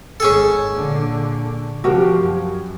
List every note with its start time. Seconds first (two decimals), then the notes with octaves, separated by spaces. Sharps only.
0.20 G#1 C#4 G#4 A4
0.75 A#2 D3
1.84 C3 F3 F#4 G4 A#4
2.17 F#2